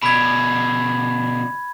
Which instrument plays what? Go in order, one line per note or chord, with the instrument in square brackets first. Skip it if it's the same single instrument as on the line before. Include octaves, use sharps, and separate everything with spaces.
[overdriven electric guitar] B2 D3 [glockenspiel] B5 G#6